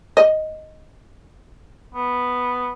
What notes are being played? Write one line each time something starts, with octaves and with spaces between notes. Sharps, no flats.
D#5
B3